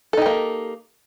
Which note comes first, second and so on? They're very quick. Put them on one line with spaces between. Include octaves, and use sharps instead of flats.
A4 D#4 G4 A#3